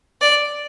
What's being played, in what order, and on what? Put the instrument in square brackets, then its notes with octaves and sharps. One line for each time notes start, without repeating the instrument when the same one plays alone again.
[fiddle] D5